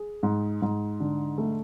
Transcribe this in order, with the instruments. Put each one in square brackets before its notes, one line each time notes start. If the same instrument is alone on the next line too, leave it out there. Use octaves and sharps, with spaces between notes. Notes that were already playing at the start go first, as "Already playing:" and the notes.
Already playing: [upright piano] G#4
G#2
G#2
D3
A3